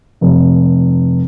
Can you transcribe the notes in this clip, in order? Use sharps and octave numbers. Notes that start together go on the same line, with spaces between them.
F1